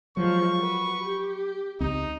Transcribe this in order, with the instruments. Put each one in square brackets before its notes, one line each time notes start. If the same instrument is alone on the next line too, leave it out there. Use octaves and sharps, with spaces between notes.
[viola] F3 G#3 [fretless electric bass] F#3 [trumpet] C#6
[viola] F#4 B4
G4
[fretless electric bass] C#2 C4 [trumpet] D#4